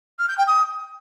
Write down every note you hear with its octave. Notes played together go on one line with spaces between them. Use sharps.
F6
G6
G5
D#6